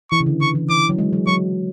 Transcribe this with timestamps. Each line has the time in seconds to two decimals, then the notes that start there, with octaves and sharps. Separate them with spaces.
0.11 E3 C#6
0.20 C#3
0.26 D3
0.41 C#3 C#6
0.55 E3
0.69 E3 D6
0.89 F#3
0.98 G#3
1.13 F#3
1.27 F#3 C#6